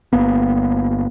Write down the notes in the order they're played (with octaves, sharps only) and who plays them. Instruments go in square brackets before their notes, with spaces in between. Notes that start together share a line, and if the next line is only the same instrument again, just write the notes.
[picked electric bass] G1 A#3 B3